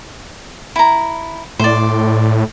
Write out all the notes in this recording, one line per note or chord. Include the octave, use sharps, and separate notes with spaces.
E4 A#5
A2 C5 D5